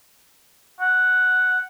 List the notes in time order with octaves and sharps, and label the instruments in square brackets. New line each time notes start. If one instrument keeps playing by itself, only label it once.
[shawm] F#5